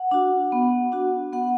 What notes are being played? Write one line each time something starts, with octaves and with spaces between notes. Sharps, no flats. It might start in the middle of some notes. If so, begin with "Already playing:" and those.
Already playing: F#5
D4 F#4
B3
D4 F#4
B3 F#5